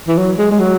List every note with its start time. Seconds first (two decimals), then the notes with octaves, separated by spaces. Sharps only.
0.08 E3
0.18 F#3
0.38 G#3
0.51 G#3
0.59 F#3